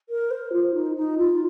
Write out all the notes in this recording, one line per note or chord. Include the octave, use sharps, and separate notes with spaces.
A#4
C5
F4
D#4
D#4
F4